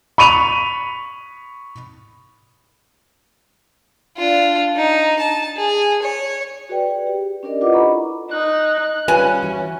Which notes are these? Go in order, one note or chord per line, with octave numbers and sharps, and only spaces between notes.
B5 C#6 D#7 F7
D4 F4
D#4
A5
G#4 G#5
C#5
F#4 G#4 B4 D5 G5
G4
C#4 D4 G4 A#4 D5 D#5
E4 F4 B4 D#5 F#5 D6
A4 D#5 A#5 B5 C#6
D#4 F#6
G3 C#4 F4 B4 G#5
E3 F#4